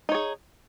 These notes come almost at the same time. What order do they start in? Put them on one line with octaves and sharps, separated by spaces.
D#4 C#5 G#4